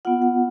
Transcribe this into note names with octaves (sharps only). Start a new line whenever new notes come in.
B3 F4 F#5
F#5